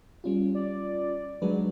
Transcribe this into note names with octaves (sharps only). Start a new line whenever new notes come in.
G3 C#4 F4
D5
F#3 G#3 D4 B4